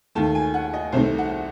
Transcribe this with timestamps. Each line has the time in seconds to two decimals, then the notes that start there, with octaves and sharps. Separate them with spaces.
0.15 D#2 D#3 A3 A5
0.35 G#5
0.54 F#5
0.74 D#5
0.92 C2 C3 D#3 A3 C4 C5
1.18 F#5